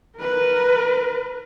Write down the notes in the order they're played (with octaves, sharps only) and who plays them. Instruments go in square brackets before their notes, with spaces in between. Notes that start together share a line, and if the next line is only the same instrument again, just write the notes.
[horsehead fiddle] A#4 B4